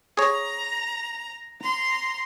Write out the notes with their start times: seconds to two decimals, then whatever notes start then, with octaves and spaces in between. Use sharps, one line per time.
0.17 G#4 C#5 A#5
1.61 A#5 C6